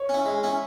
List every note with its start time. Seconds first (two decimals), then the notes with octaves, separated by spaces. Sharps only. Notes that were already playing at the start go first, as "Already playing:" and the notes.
Already playing: C#5
0.09 C#4 E4
0.26 G#3
0.43 C#4 E4